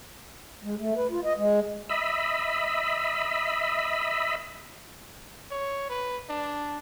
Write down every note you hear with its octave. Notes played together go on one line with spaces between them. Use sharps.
G#3
A3
B4
F4
D#5
G#3
D#5 E5 B5
C#5
B4
D4